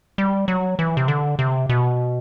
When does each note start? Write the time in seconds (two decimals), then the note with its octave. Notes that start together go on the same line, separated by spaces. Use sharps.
0.18 G3
0.48 F#3
0.79 E3
0.97 C3
1.08 D3
1.39 C3
1.69 B2